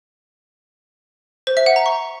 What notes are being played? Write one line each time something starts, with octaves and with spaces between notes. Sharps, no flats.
C5
E5
F#5
A#5
C#6